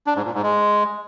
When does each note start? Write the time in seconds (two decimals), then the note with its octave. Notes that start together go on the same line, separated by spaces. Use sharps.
0.07 D4
0.16 G#2
0.25 A#2
0.34 G#2
0.43 G#3